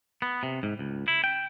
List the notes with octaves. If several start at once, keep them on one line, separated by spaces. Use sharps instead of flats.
B3
C3
G#2
C#2
E4
G5